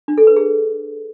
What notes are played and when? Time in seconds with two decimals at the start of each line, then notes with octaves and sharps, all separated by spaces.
0.08 D4
0.18 A4
0.27 B4
0.36 G#4